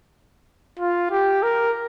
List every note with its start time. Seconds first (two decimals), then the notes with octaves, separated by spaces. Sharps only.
0.79 F4
1.11 G4
1.43 A#4